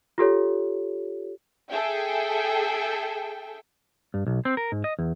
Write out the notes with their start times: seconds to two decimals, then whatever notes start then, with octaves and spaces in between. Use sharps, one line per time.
0.18 F4 G4 A4 C#5
1.70 G#4 A4 E5 G5
4.14 G2
4.27 B1
4.45 C4
4.57 A#4
4.72 G#2
4.84 D#5
4.99 E2